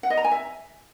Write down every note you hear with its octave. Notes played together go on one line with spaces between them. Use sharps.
F#5
D#5
A#5
G#5
E5